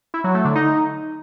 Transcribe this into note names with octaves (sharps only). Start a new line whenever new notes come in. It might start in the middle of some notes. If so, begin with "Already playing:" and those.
E4
F#3
A3
D3
D#4